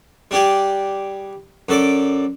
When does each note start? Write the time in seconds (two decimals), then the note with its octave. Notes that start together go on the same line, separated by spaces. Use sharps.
0.31 G3 D4 G4 G#4
1.69 F#2 A4 D5 D6